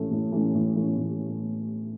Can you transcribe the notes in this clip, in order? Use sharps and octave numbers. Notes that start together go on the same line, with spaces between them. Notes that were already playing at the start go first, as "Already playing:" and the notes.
Already playing: A2 E3 A3 C#4
A2
E3 A3 C#4
A2
E3 A3 C#4
A2